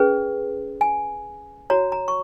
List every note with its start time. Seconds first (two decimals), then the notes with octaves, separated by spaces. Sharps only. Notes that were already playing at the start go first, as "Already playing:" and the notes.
Already playing: C#4 G#4 B4
0.81 G#5
1.70 F#4 C#5 A#5
1.92 A#5
2.08 C#6